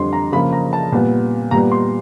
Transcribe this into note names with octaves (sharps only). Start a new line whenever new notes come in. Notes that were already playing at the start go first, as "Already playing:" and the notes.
Already playing: F2 D3 G3 C6
A#5
C#3 F3 A#3 B5
A#5
A5
A#2 G3 B3
A#2 G3 B3 A#5
C6